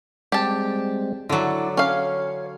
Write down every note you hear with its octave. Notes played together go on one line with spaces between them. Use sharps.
G3 G#3 C4 G4 A5
D3 F#3 E4 D5
C#4 C#5 F5